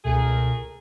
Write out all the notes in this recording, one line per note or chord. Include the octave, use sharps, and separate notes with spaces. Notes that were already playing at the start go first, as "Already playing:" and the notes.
C#2 B2 A3 G#4 A#4